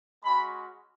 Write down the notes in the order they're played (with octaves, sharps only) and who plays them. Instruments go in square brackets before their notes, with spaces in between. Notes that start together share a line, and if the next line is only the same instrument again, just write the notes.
[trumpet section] G#3 C#4 F#4 B5